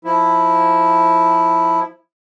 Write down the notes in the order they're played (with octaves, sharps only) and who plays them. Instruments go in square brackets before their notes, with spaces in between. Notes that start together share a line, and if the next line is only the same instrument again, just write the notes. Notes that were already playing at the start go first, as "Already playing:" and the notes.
[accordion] F3 E4